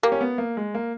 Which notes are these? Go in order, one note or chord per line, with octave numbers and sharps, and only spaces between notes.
A#3 G4
C#4
B3
A#3
G#3
A#3